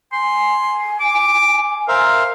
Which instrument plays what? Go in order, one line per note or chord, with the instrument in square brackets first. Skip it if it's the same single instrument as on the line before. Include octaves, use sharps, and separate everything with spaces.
[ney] G#5 [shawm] C6
[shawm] D6
[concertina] A#4 C5 E5 [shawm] F5